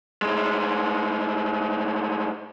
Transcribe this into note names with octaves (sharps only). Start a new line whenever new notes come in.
A2 G#3